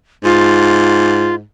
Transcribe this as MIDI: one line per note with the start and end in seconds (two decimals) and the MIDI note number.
0.24 1.43 44
0.24 1.35 65